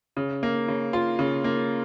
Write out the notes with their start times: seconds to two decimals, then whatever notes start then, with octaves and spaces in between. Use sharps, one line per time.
0.17 C#3
0.43 A#3
0.68 C#3
0.93 F4
1.19 C#3
1.44 A#3